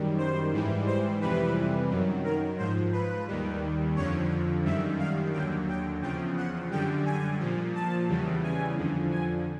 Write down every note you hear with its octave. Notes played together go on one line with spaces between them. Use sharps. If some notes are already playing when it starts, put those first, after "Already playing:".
Already playing: F#2 D#3 G3
C5
G#2 E3 G3
C5
F2 C3 E3 G3 B4
F#2 D#3 F#3
A#4
G#2 F3 C5
B4
D#2 D#3 G3
F2 D3 F3 C#5
F#2 D#3 G3 E5
F5
D#2 D3 F#3 G5
G5
E2 C#3 F3 G5
F#5
F#2 D3 G3 G5
G#5
A#2 F3
A5
E2 C#3 E3 G3
G#5
F2 D3 F3
G#5